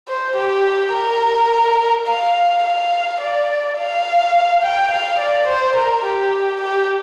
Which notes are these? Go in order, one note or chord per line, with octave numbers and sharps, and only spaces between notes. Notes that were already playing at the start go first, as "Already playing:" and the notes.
C5
G4
A#4
F5
F5
D5
F5
G5
F5
D5
C5
A#4
G4
G4